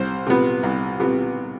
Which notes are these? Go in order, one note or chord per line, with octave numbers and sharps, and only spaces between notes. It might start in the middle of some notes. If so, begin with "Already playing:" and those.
Already playing: C2 C5
C3 F3 B3
C2
C3 F3 B3